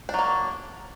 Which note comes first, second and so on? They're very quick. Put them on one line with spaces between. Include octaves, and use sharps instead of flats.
D4 F#3 A#3